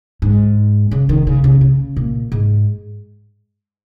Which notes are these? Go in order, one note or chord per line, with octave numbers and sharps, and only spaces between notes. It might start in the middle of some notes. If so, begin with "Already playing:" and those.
G#2
C#3
D#3
C#3
C#3
C#3
A#2
G#2